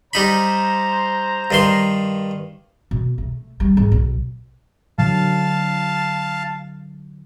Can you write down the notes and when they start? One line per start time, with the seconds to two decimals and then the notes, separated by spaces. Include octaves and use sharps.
0.13 G3 D#4 C5 A#5 B5
1.51 G2 D#3 C6
2.91 B2
3.18 A3
3.60 G3
3.77 G#2
3.92 B1
4.99 D3 F#3 F5 A5